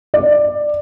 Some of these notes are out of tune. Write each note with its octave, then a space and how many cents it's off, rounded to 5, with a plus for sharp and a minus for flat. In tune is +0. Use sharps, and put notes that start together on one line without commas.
D5 +15